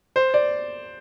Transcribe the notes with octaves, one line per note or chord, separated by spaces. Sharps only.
C5
D5